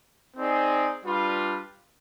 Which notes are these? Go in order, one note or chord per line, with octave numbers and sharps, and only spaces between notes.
C4 D#4 G#4 D5
G3 D4 F4 B4